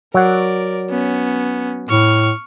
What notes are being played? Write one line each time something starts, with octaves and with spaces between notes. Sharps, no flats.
F#3 A#4 D5 F#5
B3 C#4
A2 C#6 F6